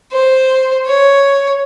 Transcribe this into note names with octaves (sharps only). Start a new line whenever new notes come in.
C5
C#5